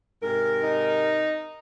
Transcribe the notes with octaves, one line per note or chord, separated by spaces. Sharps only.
G#2 C3 A#4
D#4